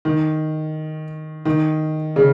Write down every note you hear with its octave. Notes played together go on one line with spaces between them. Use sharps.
D#3
D#3
C#3